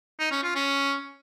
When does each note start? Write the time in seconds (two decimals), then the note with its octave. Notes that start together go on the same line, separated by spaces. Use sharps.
0.19 D#4
0.31 C#4
0.43 F4
0.55 C#4